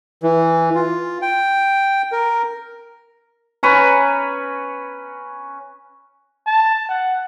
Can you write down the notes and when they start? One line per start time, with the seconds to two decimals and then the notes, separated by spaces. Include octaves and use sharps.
0.23 E3
0.75 F4
1.22 G5
2.12 A#4
3.63 C#4 B4 C#5 A#5
6.47 A5
6.89 F#5